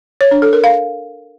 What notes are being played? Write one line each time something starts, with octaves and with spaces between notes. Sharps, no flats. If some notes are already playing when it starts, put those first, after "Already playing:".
C#5
D4
A4
A#4
F5